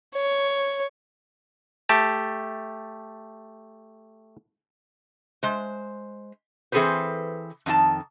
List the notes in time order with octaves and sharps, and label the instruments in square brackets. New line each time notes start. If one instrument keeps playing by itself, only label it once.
[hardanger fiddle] C#5
[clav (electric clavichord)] A3 G4 A5
[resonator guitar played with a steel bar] G#3 C5
E3 C4 G#4 A4 B4 C5
F2 D#3 E4 A5